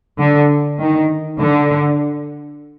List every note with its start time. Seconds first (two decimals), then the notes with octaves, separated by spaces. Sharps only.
0.19 D3
0.80 D#3
1.40 D3